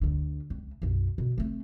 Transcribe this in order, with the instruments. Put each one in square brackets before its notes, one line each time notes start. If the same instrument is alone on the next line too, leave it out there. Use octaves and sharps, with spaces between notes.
[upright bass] D2 D3
C#2
B1 F#2
B2
A3 C4